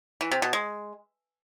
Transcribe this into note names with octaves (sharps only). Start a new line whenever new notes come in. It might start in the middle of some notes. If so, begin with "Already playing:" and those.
E3
C3
B2
G#3